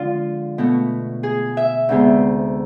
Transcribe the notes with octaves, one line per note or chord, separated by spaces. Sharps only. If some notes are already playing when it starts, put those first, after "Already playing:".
Already playing: D3 F3 G#3 D4 F4
B2 A3
G#4
E5
D2 C3 G#3 B3